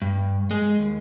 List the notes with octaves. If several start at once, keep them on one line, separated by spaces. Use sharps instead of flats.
G2
G#3
D#2